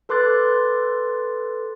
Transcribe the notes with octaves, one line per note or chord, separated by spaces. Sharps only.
A4 B4 C6 D6 F#6 A6